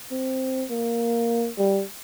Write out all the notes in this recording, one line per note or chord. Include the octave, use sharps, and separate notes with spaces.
C4
A#3
G3